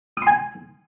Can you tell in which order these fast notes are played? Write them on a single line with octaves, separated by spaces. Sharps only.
D#6 C6 G#5